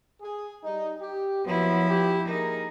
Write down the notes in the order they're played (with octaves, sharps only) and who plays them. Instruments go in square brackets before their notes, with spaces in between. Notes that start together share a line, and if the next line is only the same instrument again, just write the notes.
[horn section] G#4
G3 D#4
G4
[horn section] A#2 F#3 B3 [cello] F3 E4
[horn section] F4 G4
[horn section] A#3 G#4 A#4 [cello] D#4